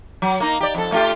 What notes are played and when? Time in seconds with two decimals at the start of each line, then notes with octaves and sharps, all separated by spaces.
0.22 F#3
0.40 A#3 D#4
0.61 G4 D5
0.75 F2 A4
0.92 A3 F4 G4